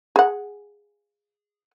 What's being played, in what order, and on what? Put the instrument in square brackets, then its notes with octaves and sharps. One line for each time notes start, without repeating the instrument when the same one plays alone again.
[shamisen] G#4 F#5